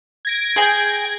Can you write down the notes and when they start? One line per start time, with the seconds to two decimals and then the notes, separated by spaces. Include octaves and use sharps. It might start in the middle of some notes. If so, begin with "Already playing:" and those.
0.25 G#6 A#6 D7
0.56 G#4 G5